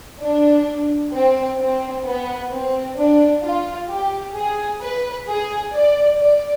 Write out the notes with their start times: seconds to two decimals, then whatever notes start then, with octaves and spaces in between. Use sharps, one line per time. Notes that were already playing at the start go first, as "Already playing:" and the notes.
0.21 D4
1.13 C4
1.60 C4
2.06 B3
2.52 C4
2.98 D4
3.44 F4
3.90 G4
4.36 G#4
4.82 B4
5.28 G#4
5.74 D5
6.20 D5